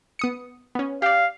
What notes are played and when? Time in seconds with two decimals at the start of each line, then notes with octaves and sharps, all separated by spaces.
0.19 B3 D#6 C#7
0.75 B3 C#4
1.02 G4 D5 F5